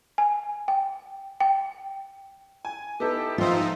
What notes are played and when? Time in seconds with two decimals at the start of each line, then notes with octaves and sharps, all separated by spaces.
0.18 G#5
0.68 G5
1.40 G5
2.65 G#5
3.00 B3 D#4 E4 G4 A4
3.38 G#2 F3 C4 D#4 F4 C5 E5